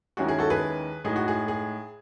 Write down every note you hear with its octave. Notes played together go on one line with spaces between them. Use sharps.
D#2 D#3 G#3 C#4 E4 F#4
G#4
F#4 A4
G#4 B4
A2 G#3 D#4 G#4
F#4
G#4
G#4